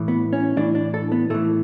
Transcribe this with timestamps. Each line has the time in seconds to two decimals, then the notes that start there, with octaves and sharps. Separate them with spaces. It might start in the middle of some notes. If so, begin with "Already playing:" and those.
Already playing: A2 E3
0.08 B3
0.33 C#4
0.57 A2 E3 D4
0.75 D4
0.94 A4
1.12 B3
1.30 A2 E3 A3